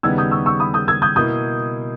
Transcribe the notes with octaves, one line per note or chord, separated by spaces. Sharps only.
D#2 C#3 G3 B3 D#4 E6 G#6
D#6 G6
C#6 E6
C#6 E6
B5 D#6
D#6 G6
E6 G#6
D#6 G6
B2 A#3 E4 D#6 G6